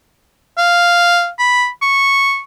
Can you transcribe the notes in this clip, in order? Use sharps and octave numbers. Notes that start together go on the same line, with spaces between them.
F5
B5
C#6